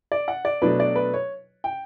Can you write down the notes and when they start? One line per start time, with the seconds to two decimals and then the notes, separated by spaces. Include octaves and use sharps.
0.12 D5
0.28 F#5
0.45 D5
0.62 B2 F#3 A3 D4 B4
0.80 D5
0.96 B4
1.14 C#5
1.64 G5